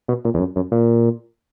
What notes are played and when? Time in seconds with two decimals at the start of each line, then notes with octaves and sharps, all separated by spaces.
0.08 B2
0.25 A#2
0.34 E2
0.39 F#2
0.56 F#2
0.72 A#2